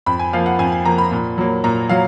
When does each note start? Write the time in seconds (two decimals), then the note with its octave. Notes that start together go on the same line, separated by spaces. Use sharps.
0.06 F2 B5
0.19 G#5
0.33 F3 A#3 F5
0.46 F#5
0.59 F2 G#5
0.72 G#5
0.85 F3 A#3 A#5
0.98 B5
1.12 A#2
1.38 F#3 A#3
1.64 A#2 A#5
1.89 F#3 F5